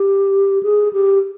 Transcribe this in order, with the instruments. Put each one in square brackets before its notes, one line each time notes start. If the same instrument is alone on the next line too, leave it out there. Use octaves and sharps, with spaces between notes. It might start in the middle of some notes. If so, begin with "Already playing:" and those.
Already playing: [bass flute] G4
G#4
G4